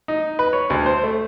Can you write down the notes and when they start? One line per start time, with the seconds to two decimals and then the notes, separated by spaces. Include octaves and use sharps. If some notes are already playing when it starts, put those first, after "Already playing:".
0.08 D#4
0.39 B4
0.53 C#5
0.70 D2
0.86 C5
1.03 A3